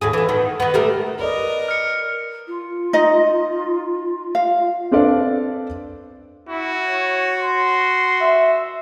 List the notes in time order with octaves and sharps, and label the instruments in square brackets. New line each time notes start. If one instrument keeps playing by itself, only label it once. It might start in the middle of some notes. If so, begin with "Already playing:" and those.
[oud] D#2 A2 G#4
D3 E3
D#3 B3
D#3 B3
G3 A3 A#4
[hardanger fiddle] A#4 [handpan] B4 D5 D#5
[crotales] F6 C#7
[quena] F4
[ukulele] D#4 D#5
F5
[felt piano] C4 D4 A4 B4 D5 F5
[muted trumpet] E4 [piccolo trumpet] F#4
[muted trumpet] C#5
C6
[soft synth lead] E5